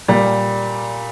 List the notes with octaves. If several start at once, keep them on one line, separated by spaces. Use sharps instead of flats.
A#2 G3